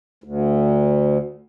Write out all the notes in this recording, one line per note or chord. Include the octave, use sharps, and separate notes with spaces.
D2